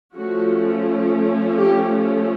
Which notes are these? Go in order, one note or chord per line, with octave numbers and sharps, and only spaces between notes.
F3 A3 C#4 F#4
G4